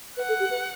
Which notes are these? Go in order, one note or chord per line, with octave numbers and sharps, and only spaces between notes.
B4 F#5
A4
G4
B4